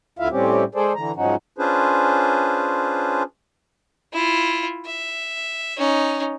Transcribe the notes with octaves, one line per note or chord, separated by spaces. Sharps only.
D2 D3 E4 F4 E5 F5
A2 G3 C4 C#4 G4
G#3 G#4 A4 C5 D5
D3 E3 A#5
G#2 F3 F#3 C#4 D#4 F#4
C#4 D4 F4 G#4 B4 C5
E4 F4
E5
C#4 D#4